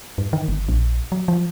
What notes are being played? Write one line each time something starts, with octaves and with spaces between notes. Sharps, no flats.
G2
D#3
G1
A#1
F#3
F3